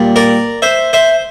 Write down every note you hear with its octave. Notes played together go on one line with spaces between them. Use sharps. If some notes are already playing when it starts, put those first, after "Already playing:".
Already playing: A#2 G3
A#4 D5
C5 E5
C5 E5